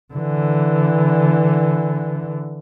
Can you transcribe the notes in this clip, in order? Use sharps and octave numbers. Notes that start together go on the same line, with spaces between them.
D3 E3